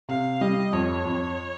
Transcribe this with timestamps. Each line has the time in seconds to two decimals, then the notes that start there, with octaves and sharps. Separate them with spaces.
0.09 C3 F5
0.41 G3 D#5
0.73 F2 C#5
1.05 F2